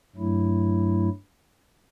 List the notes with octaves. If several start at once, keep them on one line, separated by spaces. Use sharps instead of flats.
G2 F#3 A3 E4